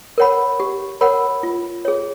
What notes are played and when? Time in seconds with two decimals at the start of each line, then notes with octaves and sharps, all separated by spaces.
0.18 A#4 C#5 F#5 B5
0.60 G4
1.01 A#4 C#5 F#5 B5
1.43 F4
1.85 G#4 C#5